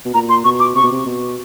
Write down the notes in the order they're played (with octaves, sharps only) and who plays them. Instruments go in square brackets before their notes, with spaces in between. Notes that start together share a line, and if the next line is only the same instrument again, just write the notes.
[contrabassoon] B2
[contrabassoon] A#2 [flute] A#5
[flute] C6
[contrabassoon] B2 [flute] C#6
[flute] D6
[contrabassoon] C3 [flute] C#6
[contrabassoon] B2
C3
B2